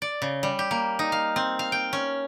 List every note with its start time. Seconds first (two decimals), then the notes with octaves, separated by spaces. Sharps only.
0.02 D5
0.22 C#3
0.43 G3
0.59 G4
0.71 A#3
0.99 D#4
1.12 F5
1.36 C4
1.59 F5
1.72 G5
1.93 C#4